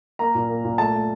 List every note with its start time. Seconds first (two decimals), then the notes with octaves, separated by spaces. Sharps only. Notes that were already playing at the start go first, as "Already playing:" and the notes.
0.19 A#3 A#5
0.35 A#2
0.49 A#3
0.65 A#2
0.78 A3 A5
0.93 A3